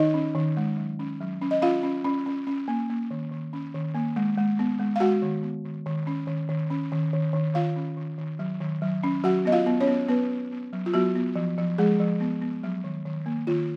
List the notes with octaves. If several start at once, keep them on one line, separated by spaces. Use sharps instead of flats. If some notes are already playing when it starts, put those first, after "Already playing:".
Already playing: D#3 D#4 D#5
C#4
D#3
G#3
F#3
C#4
F#3
C#4
D#5
C#4 F4 F5
C#4
C#4
C#4
C#4
A#3
A#3
D#3
D#3
C#4
D#3
A#3
G#3
G#3
B3
G#3
F5
G#3 F#4 F#5
D#3
B3
D#3
D#3
C#4
D#3
D#3
C#4
D#3
D#3
D#3
D#3 F4 F5
C#4
D#3
D#3
F#3
D#3
F#3
C#4
F#3 F#4 F#5
B3 D#5
F4 F5
B3
C#4 C#5
B3
B3 B4
B3
B3
F#3
F4
F#3 B3 F#4
B3
F3
F3
F3 G#3 G#4
F3
B3
B3
F#3
D#3
D#3
A#3
D#3 F4